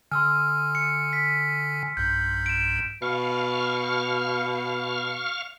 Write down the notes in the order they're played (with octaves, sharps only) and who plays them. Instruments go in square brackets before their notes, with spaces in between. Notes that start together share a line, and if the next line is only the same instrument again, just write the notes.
[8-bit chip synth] D3 G#5 [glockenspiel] C6 E6 F6
[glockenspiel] C#7
B6
[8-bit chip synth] B1 G2 [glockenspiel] G6
[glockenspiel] D7 E7
[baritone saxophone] B2 [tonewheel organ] F5 C#6 F6